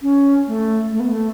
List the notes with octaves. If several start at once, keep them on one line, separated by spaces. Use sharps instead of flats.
C#4
A3
A3
B3
A3